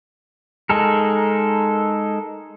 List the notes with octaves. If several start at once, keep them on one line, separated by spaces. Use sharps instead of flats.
G#3 D#4 A4 A#4